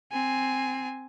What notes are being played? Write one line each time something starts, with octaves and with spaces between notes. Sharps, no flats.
C4 G#5